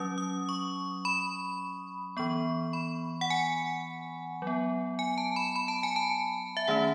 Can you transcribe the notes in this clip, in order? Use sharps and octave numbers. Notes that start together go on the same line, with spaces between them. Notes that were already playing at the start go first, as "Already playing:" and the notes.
Already playing: F#3 C#4 D#6
D#6
C#6
B5
E3 B3 C#6
B5
F#5
G#5
F#3 B3
G#5
A5
B5
B5
A5
G#5
A5
E5
D#3 A3 C#4 F#5